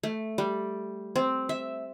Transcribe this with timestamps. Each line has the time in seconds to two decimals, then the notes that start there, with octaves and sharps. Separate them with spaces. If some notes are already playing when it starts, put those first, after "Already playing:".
0.03 A3
0.38 G3
1.16 C4
1.49 E5